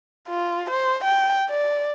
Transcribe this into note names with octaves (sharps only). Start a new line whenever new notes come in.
F4
C5
G5
D5